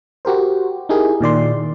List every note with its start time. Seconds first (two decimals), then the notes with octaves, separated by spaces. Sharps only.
0.25 F#4 G4 A#4 C5
0.89 D#4 E4 G4 G#4 A#4
1.21 A#2 D#3 D5 C6